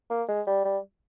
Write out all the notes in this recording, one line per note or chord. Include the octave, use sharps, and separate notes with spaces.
A#3
G#3
G3
G3